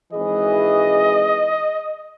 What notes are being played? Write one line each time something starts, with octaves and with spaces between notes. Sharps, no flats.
G#1 E3 G#4 D#5